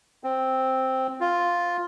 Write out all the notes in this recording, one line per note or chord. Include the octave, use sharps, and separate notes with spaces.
C4
F4